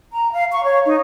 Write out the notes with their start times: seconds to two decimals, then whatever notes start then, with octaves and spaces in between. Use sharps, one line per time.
0.13 A#5
0.33 F5
0.52 C#6
0.64 C#5
0.85 D#4